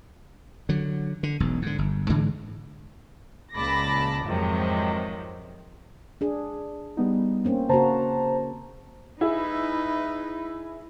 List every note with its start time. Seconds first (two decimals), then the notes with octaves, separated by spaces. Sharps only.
0.69 D3 F#3
1.23 D3
1.40 E1 B1
1.62 G#2 D3
1.78 G1
2.09 G#2 D3 E3 G#3
3.55 C#2 A#2 A5 B5 D6 A#6
4.25 F2 G#2 C3 D#3 F3 F#3
6.21 D4 G#4
6.97 G3 B3 D#4
7.45 A#3 C4 C#4
7.69 C#3 A#3 F#4 C5 A5 A#5
9.21 D#4 E4 G#4 B4